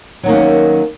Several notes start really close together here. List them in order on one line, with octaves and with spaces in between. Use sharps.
F#3 D#3 A#3 C#4